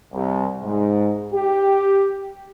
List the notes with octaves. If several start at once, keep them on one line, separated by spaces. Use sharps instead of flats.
C2
G#2
G4